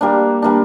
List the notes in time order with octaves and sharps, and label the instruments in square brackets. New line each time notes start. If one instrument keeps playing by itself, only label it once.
[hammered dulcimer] G3 A#3 D4
G3 A#3 D4